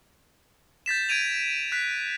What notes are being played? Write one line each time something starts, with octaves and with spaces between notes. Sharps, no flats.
G6 A6 B6 E7
G#6 D7 D#7 F7
F#6 B6